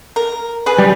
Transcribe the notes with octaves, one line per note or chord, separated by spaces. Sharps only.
A#4
G#4 B4
G3